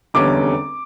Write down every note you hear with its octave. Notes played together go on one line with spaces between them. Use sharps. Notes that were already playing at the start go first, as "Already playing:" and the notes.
F1 E2 D3 G3 C#4 D6